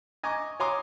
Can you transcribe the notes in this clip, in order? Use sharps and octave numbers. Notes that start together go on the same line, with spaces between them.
D#5 G#5 A#5 C#6 D6
C#5 G#5 A#5 C6 D6 D#6